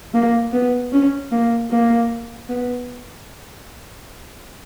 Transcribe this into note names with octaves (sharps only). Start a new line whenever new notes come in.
A#3
B3
C#4
A#3
A#3
B3